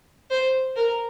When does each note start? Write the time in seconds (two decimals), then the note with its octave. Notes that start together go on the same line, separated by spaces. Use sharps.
0.30 C5
0.76 A#4